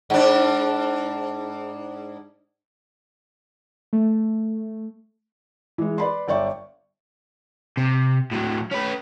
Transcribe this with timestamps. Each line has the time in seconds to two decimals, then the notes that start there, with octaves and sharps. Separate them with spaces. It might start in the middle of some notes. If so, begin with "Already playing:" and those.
0.10 G#2 D4
3.93 A3
5.78 E3 G#3
5.98 B4 D5 B5 C6
6.28 G1 D5 E5 G5 C#6
7.77 C3
8.31 A2 F#3
8.71 C#4 B4